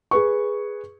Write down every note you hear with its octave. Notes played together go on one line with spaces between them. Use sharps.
G#4 B4 C#6